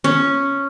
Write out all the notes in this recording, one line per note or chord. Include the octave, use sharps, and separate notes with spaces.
C#4